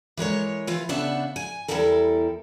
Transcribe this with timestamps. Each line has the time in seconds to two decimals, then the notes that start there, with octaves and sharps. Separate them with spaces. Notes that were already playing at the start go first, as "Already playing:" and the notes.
0.17 E3 G#3 A#4 C#5
0.67 E3 F4
0.89 C#3 B3 D4 E5 F#5 A5
1.36 G#5
1.68 E2 F#3 G3 E4 A4 A#4